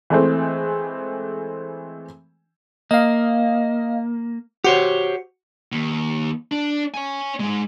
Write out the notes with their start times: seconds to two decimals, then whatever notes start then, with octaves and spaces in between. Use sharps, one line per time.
0.10 E3 G#3 A3 C4
2.91 A#3 D#5 F5
4.64 F#4 G4 C5 C#5
5.72 D#2
6.51 D4
6.94 C#5 G#5
7.40 G#2 G#3